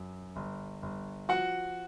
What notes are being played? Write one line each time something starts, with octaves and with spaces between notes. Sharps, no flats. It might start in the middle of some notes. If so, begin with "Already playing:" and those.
Already playing: F#2
G1
G1
F3 F#4 F#5